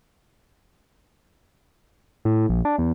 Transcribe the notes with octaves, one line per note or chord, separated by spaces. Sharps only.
A2
A#1
D4
E2